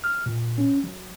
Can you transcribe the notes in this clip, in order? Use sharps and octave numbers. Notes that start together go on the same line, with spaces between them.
F6
A#2
C#4
F#3